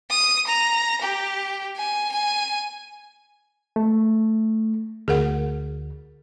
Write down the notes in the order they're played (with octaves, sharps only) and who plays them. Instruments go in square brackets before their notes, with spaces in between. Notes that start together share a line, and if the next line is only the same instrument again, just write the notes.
[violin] D#6
A#5
G4
G#5
G#5
[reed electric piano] A3
[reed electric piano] D2 [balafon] G#4 A#4 F#5